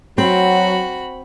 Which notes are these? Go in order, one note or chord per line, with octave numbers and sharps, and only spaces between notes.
F#3 C4 F#4 B5